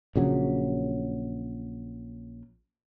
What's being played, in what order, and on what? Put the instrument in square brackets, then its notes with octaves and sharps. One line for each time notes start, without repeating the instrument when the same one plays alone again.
[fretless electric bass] A#1 C#3 F#3